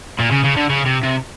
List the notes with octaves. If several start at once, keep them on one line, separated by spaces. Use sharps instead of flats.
A#2
C#3
C#3
D3
C#3
C3
C3